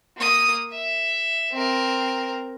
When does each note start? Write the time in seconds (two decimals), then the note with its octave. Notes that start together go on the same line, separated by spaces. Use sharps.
0.16 A#3 D#6
0.71 E5
1.52 C4 A#4